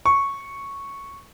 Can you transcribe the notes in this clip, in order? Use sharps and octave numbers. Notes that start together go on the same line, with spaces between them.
C#6